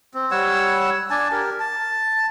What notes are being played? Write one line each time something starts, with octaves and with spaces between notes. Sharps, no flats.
C4
G3 C#5 F#5 E6
D4 G#5 A5
G4 A#4
A5